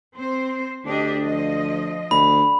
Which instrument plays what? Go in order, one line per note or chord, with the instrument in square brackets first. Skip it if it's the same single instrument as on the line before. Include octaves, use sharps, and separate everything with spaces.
[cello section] C4 C5
[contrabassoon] D2 [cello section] D4 G4 D#5
[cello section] F3 D#5
[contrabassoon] D2 [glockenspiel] B5